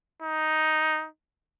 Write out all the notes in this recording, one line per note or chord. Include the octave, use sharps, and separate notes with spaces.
D#4